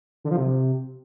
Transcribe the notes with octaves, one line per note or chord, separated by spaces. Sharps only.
D3
F3
C3